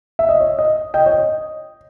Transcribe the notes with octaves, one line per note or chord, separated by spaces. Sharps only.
E5
D#5
C#5
D#5
D#5 G5
C#5
D#5